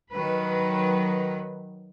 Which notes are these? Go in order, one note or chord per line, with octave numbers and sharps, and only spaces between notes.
D#3 F#3 B4